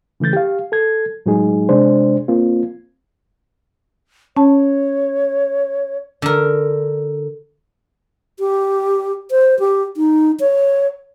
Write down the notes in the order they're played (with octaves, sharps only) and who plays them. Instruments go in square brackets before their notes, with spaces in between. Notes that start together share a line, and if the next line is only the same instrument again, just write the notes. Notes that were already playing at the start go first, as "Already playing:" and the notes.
[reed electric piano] C#3 E3 A3 G6 A6
G4 F5
A4 G#6
A2 F#3 G#3 D#4 G#4
C3 G#3 D4 C5
A#3 C4 F4
[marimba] C#4 A5 [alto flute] C#5
[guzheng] D3 A#4
[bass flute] G4
C5
G4
D#4
C#5